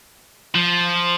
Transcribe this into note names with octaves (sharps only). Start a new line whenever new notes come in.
F3